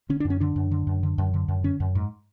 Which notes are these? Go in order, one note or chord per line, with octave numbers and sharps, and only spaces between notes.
D3 C#4
D4
F#2
C#4
D3 D4
F#2
D3
F#2
D3
F#2
D3
F#2
D3 C#4
F#2
G#2